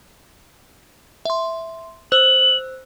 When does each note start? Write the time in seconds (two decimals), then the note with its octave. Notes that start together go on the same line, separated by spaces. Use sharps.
1.25 E5 C6
2.12 C5 E6 F#6 F#7